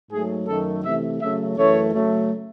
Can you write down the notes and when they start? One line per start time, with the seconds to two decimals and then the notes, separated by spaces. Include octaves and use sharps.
0.11 G#2 F#3 A3 G#4
0.47 F#2 D#3 F#3 A3 A4
0.84 C3 E3 A3 E5
1.21 C#3 F#3 A3 E5
1.57 F#2 E3 A3 C#5
1.94 C#3 F#3 A3